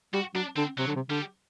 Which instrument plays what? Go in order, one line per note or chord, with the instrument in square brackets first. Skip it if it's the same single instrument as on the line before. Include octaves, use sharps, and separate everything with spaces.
[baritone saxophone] G3 [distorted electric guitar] F#4
[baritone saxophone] F#3 [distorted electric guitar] D4
[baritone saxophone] D3 [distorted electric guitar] C4
[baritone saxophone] C3 [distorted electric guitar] F#3
[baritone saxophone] D3
C3
[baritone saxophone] D3 [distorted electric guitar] G3